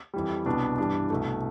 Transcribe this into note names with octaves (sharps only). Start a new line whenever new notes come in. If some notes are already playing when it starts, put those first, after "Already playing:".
F2 E3 G3
C2 B2 B3 D4
G2 E3 G3 D4
C2 B2 A3